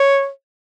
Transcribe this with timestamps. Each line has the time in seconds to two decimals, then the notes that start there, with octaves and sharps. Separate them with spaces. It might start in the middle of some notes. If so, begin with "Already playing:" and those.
Already playing: C#5